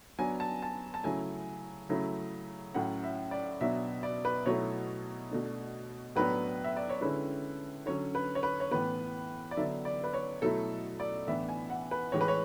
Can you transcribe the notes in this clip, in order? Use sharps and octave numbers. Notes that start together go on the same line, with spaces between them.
F#3 B3 D4 G#5
A5
A5
A5
C#3 F#3 A3 E4 G#5
C#3 F#3 A3 E4
A2 F#3 C#4 E4 F#5
E5
D5
B2 F#3 B3 D4 E5
D5
B4
B2 F#3 A3 E4 C#5
B2 A3 D4
A2 F#3 B3 D4 B4
E5
D5
C#5
D3 G#3 C#4 E4 B4
D3 F#3 C#4 C#5
B4
C#5
B4
C#5
A2 E3 B3 B4
D5
D3 F#3 B3 D4 E5
D5
B4
C#5
B2 F#3 A3 E4 A4
D5
A2 E3 B3 D4 E5
G#5
F#5
B4
A2 E3 G#3 C#5
B4
C#5